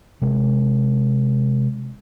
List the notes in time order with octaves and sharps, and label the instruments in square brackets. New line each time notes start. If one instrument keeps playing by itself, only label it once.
[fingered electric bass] C3 G#3